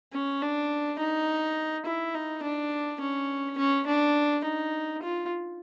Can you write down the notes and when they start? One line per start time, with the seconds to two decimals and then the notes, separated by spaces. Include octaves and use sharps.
0.13 C#4
0.42 D4
0.99 D#4
1.85 E4
2.14 D#4
2.43 D4
3.01 C#4
3.58 C#4
3.86 D4
4.44 D#4
5.02 F4